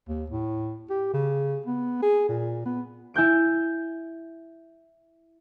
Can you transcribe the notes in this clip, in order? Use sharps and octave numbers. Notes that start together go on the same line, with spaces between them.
D#2
A2
G4
C#3
B3
G#4
A#2
B3
E4 G#5 G6 D7